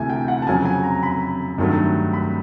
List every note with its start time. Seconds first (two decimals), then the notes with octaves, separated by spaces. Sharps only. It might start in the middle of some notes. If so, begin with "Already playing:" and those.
Already playing: D2 C3 E3 A3 G#5
0.10 G5
0.28 F#5
0.42 A5
0.47 F2 C#3 F#3 G#5
0.65 G#5
0.84 A#5
1.03 B5
1.58 G2 D#3 F#3 A3
2.13 B5